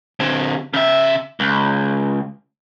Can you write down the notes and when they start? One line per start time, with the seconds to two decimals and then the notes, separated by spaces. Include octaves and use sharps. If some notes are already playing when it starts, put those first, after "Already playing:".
0.20 D3 C4
0.74 C#3 E5
1.40 C#2